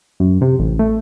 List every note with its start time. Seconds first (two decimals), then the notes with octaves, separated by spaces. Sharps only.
0.20 F#2
0.41 C3
0.59 A1
0.79 A3